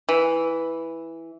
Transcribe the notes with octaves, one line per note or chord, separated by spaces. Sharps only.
E3